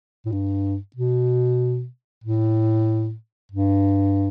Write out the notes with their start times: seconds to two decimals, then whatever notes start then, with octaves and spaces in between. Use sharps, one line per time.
0.26 A2
0.32 G2
0.96 B2
2.24 A2
3.52 G2